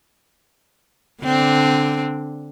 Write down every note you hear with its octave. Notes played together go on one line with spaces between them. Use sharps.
D3 C4 D4